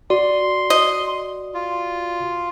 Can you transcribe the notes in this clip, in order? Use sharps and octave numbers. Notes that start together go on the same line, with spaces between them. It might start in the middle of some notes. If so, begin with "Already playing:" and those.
F#4 D5 C6
D#5
F4